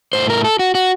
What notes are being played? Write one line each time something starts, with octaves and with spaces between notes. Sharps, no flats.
A2 A3 C5
A#4
A4
F#4
F#4